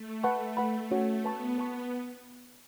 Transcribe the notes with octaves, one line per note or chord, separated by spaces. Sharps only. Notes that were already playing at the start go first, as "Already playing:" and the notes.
Already playing: A3
B4 F#5 A5 C#6
B4 F#5 B5
C#4 F#4 C#5
B3 B4 A5 C#6
B3 B4 A5 C#6